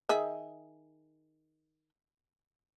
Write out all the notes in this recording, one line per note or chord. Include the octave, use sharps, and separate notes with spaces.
D#3 G#4 E5